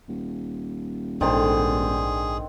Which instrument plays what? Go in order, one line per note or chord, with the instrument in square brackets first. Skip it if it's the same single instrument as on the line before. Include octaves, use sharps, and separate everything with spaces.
[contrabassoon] D#1
[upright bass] A#1 G#2 [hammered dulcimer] D3 D#3 C4 [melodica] G#4